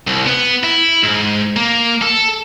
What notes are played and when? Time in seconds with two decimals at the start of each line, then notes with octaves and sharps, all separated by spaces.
0.07 C2
0.26 B3
0.63 E4
1.03 G#2
1.56 A#3
2.02 A4